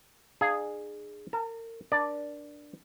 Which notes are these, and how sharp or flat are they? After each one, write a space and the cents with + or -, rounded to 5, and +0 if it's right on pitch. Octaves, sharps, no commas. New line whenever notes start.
D4 +40 G#4 +0 F5 +0
A#4 -35 A5 +0
D4 +0 A#4 +35 D5 +0